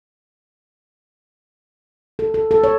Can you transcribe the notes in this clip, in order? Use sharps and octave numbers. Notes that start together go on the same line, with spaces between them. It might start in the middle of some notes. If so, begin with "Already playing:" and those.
A4
A4
A4
C#5